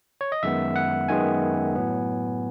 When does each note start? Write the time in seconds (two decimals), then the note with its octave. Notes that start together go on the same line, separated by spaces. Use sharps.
0.21 C#5
0.32 D#5
0.43 F#2 D#3 G#3 B3 E5
0.76 F#5
1.09 F#2 D#3 G#3 B3 G#5
1.75 A2 F#3 B3